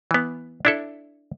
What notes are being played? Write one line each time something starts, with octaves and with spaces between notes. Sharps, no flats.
E3 B3
D4 E4 A4